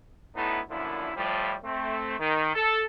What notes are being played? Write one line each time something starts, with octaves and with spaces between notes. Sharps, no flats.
D2 A2 B3 D#4 E4 A4
F#2 A#2 D3 F3 E4
A2 F3 G3
A3 C4
D#3
A4